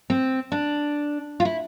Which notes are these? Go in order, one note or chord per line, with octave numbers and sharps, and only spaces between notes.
C4
D4
F4
E4